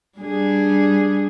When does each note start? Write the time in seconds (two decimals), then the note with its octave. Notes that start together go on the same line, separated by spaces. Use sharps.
0.19 G3 D4 G#4